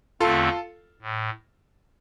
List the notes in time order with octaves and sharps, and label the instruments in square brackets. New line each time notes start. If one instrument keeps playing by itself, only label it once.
[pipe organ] E2 D3 A3 C4 [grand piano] F4 A4
[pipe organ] A2